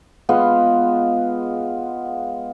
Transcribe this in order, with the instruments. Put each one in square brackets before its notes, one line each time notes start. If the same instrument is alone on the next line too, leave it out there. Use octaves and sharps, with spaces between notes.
[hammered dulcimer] G#3 B3 F4